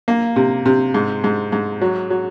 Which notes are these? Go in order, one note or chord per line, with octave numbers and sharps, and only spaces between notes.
A#3
C3
C3
G#2
G#2
G#2
F#3
F#3